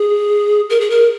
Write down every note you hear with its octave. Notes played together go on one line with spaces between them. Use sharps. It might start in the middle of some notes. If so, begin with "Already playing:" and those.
Already playing: G#4
A#4
G#4
A#4